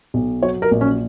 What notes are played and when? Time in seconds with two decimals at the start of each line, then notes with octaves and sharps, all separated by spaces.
0.14 B1
0.43 F#3 C#5
0.62 A#4
0.71 A#1
0.81 C#4